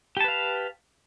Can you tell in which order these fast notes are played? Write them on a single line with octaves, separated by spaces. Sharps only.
G4 A5 B4 F5